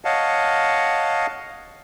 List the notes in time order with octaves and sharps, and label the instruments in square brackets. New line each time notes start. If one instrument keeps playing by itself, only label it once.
[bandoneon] C#5 D#5 F5 F#5 A5